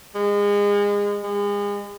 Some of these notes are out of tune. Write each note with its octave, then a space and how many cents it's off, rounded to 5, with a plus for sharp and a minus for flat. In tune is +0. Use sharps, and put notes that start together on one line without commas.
G#3 -30
G#3 -35